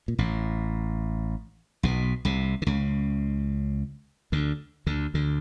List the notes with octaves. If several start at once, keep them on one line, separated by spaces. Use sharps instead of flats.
A#2
A1 A2
B1 B2
C2 C3
D3
C#2 C#3
D2 D3
D2 D3
D2 D3